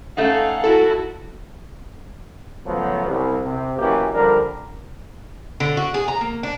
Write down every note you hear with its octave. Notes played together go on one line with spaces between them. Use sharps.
A3 C#4 D#4 F5 F#5
E4 F#4 A4
C#3 F3 F#3 A3 B3
C2
C3
F#2 B2 E3 A#3 C#4 G4
D3 F3 G3 D4 A#4
D3
F#4
G#4
A#5
A#3
D4